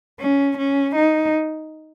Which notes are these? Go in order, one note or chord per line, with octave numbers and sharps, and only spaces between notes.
C#4
C#4
D#4